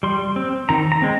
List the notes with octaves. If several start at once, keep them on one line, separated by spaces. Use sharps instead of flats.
G3 C6
C4
D#3 A#5
A#5
G#3 C4